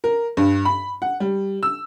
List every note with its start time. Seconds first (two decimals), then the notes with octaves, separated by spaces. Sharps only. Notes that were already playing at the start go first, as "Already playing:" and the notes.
0.04 A#4
0.37 G2
0.65 B5
1.02 F#5
1.20 G3
1.63 E6